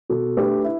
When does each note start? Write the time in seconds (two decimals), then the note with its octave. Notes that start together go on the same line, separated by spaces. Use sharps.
0.09 B2 F#4 A4
0.37 A3 D4 G4 B4
0.64 E4